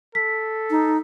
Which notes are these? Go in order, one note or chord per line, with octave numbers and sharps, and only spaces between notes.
A4 B6
D#4